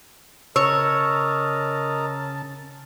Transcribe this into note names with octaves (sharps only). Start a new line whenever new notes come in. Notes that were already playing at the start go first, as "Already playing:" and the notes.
C#3 A#4 C#5 D#5 A5 A#5 E6